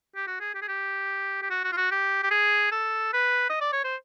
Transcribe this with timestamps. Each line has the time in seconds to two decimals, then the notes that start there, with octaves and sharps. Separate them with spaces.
0.16 G4
0.27 F#4
0.40 G#4
0.55 G4
0.62 G#4
0.68 G4
1.42 G4
1.50 F#4
1.64 F#4
1.72 F4
1.77 F#4
1.91 G4
2.23 G4
2.31 G#4
2.72 A4
3.13 B4
3.50 D#5
3.61 D5
3.72 C#5
3.84 C5